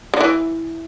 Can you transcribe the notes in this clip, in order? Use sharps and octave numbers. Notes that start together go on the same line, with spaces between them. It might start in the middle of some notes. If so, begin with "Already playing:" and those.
D3
E3